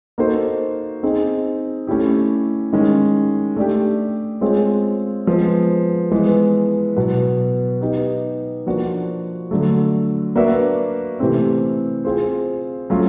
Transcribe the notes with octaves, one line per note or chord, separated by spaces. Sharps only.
A#3 D#4 F#4 A4 C5
C4 D#4 G#4
A3 C#4 E4 G4
D#3 G#3 C#4
A3 D4 G4
G#3 C4 F4 G#4 C#5
F3 G#3 B3
E3 G#3 B3
B2 F#3 B3
B3 D#4 G4
F3 A#3 D4 F#4
D3 F#3 A3
A#3 D4 F#4 B4 E5
C3 E3 A3 C4
C4 F4 G#4 C5
F#3 A3 C#4 F4